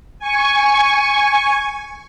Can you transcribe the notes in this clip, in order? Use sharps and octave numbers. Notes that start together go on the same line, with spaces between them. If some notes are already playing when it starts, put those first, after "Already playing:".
G#5 C#6